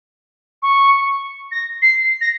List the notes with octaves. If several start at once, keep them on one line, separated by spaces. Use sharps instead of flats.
C#6
A#6
C7
A#6